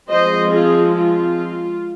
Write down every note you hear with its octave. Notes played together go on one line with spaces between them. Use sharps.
F3 G#3 C4 C5 D#5
F4 G#4
F4